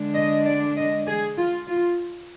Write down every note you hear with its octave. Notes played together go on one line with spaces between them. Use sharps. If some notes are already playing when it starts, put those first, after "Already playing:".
Already playing: D3 G#3 D4
D#5
D5
D#5
G#4
F4
F4